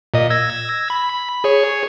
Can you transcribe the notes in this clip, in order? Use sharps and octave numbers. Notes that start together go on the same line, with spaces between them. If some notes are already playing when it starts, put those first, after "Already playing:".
A#2 D#5
E6 G#6 A#6
B5
G#4 C#5